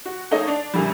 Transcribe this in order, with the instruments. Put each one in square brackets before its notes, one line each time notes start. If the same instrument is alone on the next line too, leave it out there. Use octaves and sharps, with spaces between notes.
[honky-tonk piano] F#4
A3 A#3 D#4 A4 C#5 D#5
D4 D5 F7
F#2 A#2 D3 G3